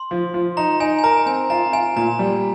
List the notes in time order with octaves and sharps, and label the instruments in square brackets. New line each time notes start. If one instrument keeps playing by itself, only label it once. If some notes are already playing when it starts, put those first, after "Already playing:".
Already playing: [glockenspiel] C6
[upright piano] F3
F3
[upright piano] D#4 [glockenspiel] A#5
[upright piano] D#4 [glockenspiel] G#5
[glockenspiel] G#5
[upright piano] A#4 [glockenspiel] A#5
[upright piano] C4 [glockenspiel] G#5
[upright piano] F4 [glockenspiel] A#5
[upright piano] F4 [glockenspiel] G#5
[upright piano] A#2 [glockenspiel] A#5
[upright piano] G3